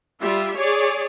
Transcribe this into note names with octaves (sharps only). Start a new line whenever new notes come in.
G3 F4 E5
G#4 C#5 D5